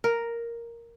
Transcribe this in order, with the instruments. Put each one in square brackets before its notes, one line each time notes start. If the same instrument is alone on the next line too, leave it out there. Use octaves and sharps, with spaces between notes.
[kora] A#4